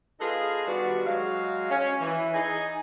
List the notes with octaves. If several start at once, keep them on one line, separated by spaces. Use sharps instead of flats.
B3 D#4 F4 G#4 A4 B4
D#3 G3 B3 D4 F#4
F#3 G#3 F5
C#4
E3
D#4 G#4 G#5